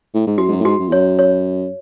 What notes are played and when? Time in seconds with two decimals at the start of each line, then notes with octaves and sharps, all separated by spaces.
0.14 A2
0.27 G#2
0.38 F#2 F#4
0.48 G#2
0.51 F#2
0.60 A2
0.65 G#2 F#4
0.79 F#2
0.88 E2
0.92 F#2 C#5
1.19 C#5